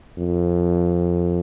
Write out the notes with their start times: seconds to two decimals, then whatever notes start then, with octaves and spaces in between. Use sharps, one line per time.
0.18 F2